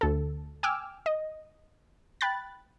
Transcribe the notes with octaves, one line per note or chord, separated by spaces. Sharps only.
D2 A4
G5 G#5 D6 E6 F6
D#5
G5 B5 F#6 A6